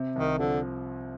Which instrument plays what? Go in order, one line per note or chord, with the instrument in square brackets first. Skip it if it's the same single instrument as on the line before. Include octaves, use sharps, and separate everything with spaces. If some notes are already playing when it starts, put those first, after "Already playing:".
Already playing: [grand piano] C3
[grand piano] C2 [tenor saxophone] D#3
[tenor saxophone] D3 [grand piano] F3